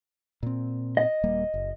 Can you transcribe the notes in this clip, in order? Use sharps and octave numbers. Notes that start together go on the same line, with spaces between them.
A#2 C4
D#5
D#1 G3 A#3
F#1